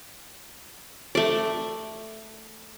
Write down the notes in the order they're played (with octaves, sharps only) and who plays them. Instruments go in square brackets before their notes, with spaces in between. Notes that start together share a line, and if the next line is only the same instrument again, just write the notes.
[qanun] A3 D5